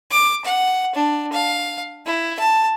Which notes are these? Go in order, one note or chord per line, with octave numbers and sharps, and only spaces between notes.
D6
F#5
D4
F5
E4
A5